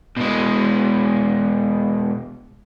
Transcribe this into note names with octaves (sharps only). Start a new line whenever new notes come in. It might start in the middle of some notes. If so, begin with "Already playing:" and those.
B2 G#3